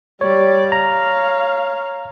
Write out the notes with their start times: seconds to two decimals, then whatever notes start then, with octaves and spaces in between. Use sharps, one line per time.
0.21 G3 C#5 D5
0.72 C#5 F5 A#5